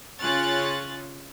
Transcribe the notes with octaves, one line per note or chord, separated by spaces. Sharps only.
C#3 F4 C#5 G#5 F#6 A6